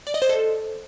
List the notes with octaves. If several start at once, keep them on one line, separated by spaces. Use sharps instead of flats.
D5
D#5
C5
A4